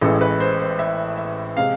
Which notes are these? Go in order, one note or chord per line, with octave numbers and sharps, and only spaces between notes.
A1 A2 E3 G#3 A4
B4
C5
C5
E5
E5
C3 G#3 F5